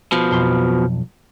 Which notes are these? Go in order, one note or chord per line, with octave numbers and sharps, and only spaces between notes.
B2 F3
B1 F2 C6